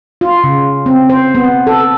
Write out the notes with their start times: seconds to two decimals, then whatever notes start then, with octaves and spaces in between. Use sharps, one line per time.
0.21 F4
0.44 C#3
0.86 C4
1.10 C5
1.35 B3
1.67 A4